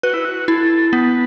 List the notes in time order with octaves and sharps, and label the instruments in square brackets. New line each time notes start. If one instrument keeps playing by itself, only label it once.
[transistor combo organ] F#4 [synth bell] B4
[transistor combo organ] E4
F#4
[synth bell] E4 [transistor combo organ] A4
[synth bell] B3 [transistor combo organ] B4